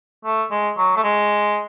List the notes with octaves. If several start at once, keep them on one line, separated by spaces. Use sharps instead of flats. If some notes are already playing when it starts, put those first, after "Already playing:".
A3
G#3
F#3
A3
G#3